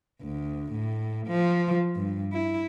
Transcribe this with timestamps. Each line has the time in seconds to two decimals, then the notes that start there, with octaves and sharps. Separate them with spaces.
0.22 D2
0.72 A2
1.27 F3
1.96 G2
2.33 E4